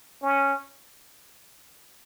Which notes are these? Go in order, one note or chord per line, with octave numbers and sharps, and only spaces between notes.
C#4